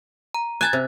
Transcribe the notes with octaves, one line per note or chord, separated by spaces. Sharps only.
A#5
G#5 A5 F#6 G#6 A6
C3